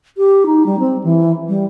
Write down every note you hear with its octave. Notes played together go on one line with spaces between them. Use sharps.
G4
D#4
G3
C4
E3
G3